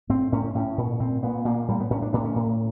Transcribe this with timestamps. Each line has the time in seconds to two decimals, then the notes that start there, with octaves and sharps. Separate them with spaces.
0.09 A2 C4
0.32 A2 C#4
0.55 A2 C#4
0.78 A#2
1.00 A#2 C4
1.23 A#2 B3
1.45 A#2 A#3
1.68 A2 G3
1.80 B3
1.90 A2 C#4
2.02 D4
2.13 A2 D4
2.25 C#4
2.36 A2